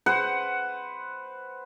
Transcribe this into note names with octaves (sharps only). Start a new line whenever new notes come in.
B4 C5 F#5